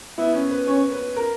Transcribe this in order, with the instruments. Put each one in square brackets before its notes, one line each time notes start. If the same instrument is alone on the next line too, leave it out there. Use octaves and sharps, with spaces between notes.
[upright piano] B3 [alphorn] E4
[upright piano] C#4
B4
[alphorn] C#4 [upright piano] C#5
[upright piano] B4
A#4